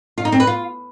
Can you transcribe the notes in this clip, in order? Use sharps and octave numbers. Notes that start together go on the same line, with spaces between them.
F4
D#4
C4
B4
F4